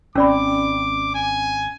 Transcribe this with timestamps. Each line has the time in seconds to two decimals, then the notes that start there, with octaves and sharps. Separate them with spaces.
0.15 G#1 C4 C#4 D5 B5 D6
1.15 G#5